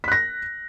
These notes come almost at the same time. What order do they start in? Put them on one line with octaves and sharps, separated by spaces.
B6 F#6 A#6